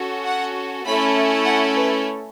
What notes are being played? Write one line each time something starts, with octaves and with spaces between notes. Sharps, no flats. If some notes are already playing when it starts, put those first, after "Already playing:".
Already playing: C#4 F#4 A4
F#5
A3 C#4 E4 A4 B5
F#5
B4